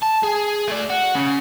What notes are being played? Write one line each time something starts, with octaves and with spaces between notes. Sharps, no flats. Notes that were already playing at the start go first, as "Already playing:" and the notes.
A5
G#4
A3 D5
F#4
C#3